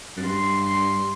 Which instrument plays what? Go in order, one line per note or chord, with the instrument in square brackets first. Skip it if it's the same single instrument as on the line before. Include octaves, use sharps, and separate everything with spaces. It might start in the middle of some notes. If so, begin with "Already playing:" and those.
[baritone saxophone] F#2
[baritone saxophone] G2 [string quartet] C6
[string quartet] C6